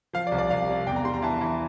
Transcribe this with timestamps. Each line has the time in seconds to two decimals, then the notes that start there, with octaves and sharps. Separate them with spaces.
0.13 F3 F5
0.27 D5
0.32 C2
0.38 D5
0.50 C2 F5
0.68 C3
0.87 E2 G5
0.96 A#5
1.04 G3 C6
1.14 A#5
1.22 E3 A5
1.41 E3